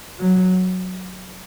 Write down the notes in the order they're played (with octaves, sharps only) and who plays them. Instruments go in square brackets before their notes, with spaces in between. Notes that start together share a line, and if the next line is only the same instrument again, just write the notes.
[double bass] F#3